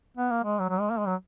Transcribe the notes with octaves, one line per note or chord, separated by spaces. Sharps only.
B3
A#3
G#3
F#3
F#3
G#3
A#3
G#3
F#3